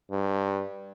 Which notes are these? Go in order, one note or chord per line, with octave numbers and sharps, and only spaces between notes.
G2